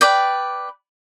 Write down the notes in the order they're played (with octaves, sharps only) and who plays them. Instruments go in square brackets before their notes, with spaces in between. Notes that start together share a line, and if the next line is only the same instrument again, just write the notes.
[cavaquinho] B4 D5 G5